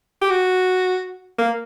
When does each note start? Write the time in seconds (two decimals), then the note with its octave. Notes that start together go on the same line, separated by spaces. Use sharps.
0.21 G4
0.30 F#4
1.39 A#3